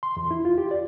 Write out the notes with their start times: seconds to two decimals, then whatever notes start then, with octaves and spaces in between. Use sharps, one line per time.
0.03 C6
0.17 E2
0.31 E4
0.45 F4
0.58 G4
0.71 D5